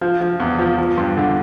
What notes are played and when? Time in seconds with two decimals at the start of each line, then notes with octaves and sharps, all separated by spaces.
0.01 F3
0.21 F3
0.40 E2
0.59 F3
0.78 F3
0.97 G2
1.17 D3